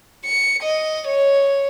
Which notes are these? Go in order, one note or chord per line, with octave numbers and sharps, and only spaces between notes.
C#7
D#5
C#5